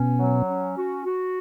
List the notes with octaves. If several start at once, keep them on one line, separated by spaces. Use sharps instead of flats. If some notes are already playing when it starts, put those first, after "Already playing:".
Already playing: B2 C#4
F#3
C#4
F#4
F#4